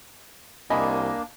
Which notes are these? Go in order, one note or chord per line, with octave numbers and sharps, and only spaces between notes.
C2 A#3 D4 D#5 G#5 B5